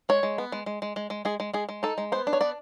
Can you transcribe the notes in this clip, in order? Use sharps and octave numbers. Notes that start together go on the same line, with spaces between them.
G#3 C#5
G#3
B3
G#3
G#3
G#3
G#3
G#3
G#3 G#4
G#3
G#3 G#4
G#3
D#4 A4
G#3
B3 C5
D4
C#5
B3 D5